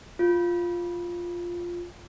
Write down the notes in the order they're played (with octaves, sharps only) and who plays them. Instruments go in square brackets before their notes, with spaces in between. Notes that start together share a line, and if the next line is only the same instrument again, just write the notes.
[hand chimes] F4